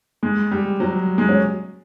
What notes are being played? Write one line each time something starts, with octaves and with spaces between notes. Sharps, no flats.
G#3
G3
F#3
G#3
C#4